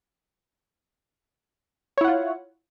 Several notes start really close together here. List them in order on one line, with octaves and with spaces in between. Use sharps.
C#5 E4 F#5 F4